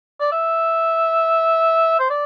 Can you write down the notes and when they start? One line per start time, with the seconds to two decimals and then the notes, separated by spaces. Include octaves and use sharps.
0.20 D5
0.32 E5
2.00 C5
2.10 D5